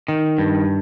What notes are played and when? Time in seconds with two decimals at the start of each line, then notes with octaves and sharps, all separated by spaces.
0.08 D#3
0.38 G2